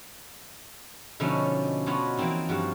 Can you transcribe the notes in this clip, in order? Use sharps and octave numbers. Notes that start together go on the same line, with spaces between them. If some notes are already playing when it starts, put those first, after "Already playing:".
B2 D3 F3 A3 C#4 D#4
B3 D4 F4 F#4 C#5 D#5
E3 F3 A#3 C4 D#4
G2 F3 F#4